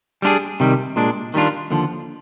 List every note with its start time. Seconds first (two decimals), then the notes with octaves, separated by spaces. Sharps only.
0.22 G3 D4 F4 G#4
0.60 C3 D#3 G3
0.96 A#2 G#3 D4
1.34 D#3 G3 D4 F4
1.71 D#2 D3 F3